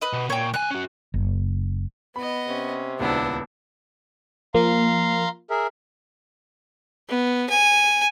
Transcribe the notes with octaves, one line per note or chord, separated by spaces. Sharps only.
B4 D#5
B2
A#2 C#5 G5
C2 G#5 F#6
C#4 F#4
F#1
B3 D#5 B5
C3 C#4
D#1 C#2 B3 D4 E4
F3 A#3 F5 A#5 C6
G#4 A#4 E5
B3
G#5